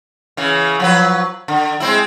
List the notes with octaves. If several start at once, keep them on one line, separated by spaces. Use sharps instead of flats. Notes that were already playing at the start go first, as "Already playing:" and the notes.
C#3 E3
F3 F#3 B4
D3
G#3 C4 E4